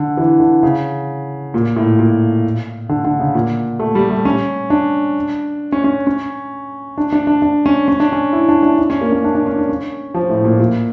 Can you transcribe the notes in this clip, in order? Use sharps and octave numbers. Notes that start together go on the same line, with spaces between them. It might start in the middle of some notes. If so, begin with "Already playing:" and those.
Already playing: D3
E3
D3
C#3
A#2
A2
A#2
D3
D3
C#3
A#2
A3
G3
A3
C#4
D4
C#4
C#4
C#4
D4
D4
D4
D4
C#4
C#4
D4
C#4
E4
D4
D4
D4
C#4
A#3
C#4
D4
D4
C#4
D4
C#4
F3
A2
A#2
A#2